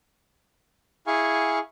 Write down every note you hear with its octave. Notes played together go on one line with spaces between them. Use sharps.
E4 G#4 F5 G#5 C#6